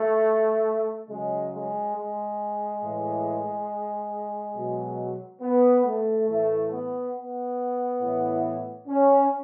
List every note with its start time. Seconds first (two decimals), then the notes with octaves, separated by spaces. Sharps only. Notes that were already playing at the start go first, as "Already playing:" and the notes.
Already playing: A3
1.08 C#3 F#3 G#3
1.52 G#3
1.94 G#3
2.81 A2 E3
4.55 B2 F#3
5.41 B3
5.85 A3
6.28 A2 E3 A3
6.71 B3
7.15 B3
8.01 A2 E3
8.88 C#4